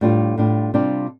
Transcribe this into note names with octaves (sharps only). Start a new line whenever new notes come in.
A2 G3 D4 F4
A2 G3 D4 F4
C3 G3 D4 F4